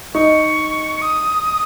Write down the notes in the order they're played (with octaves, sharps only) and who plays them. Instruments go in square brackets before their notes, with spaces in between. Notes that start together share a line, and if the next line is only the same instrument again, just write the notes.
[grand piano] D#4 [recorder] C#6
[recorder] D#6